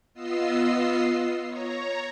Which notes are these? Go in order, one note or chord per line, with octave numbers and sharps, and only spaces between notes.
B3 F4 D#5 E6 C7
C#5 A#5